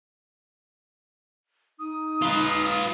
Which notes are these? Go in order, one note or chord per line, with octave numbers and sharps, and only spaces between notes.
D#4 D#6
F4 B4